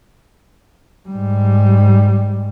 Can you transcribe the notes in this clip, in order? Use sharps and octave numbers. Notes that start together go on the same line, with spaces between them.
G#2 G3